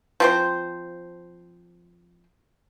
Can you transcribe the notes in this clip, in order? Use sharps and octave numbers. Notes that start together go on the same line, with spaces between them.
F3 C4 C5